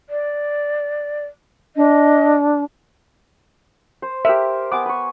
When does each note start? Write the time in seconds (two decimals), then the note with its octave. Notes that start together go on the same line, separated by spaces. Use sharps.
0.10 D5
1.76 D4 D#5
4.02 C5
4.25 G4 A#4 E5
4.72 B3 G#5 D6
4.86 B4 C#6